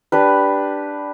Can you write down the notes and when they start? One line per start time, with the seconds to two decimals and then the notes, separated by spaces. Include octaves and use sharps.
0.12 D4 G4 B4